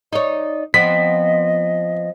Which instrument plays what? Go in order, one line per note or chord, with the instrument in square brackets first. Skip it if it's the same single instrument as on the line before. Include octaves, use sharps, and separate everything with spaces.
[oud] D#4 C#5 [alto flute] D5
[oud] F3 B3 C4 [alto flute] D#5 [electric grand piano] B6